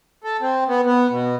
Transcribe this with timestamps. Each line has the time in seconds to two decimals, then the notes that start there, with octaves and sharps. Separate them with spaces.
0.24 A4
0.41 C4
0.68 B3
0.86 B3
1.11 B2